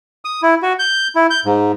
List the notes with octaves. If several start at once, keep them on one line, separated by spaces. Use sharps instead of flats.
D#6
E4
F#4
G6
E4
G6
G#2